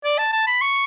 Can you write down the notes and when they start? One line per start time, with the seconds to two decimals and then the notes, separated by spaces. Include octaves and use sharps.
0.04 D5
0.18 A5
0.32 A5
0.47 B5
0.61 C#6